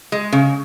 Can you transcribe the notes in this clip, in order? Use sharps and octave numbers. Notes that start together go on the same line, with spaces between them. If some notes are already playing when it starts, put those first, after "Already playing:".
G#3
C#3